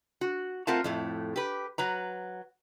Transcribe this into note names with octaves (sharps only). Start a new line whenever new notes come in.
F#4
A3 C4 F4 A#4 F#5 A5
F2 A2 A3
G4 B4
F#3 B4 A#5